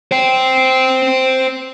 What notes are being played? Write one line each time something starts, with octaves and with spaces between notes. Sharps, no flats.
C5 G5